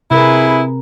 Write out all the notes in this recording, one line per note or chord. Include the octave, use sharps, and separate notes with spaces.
C3 E4 G#4 A#4 B4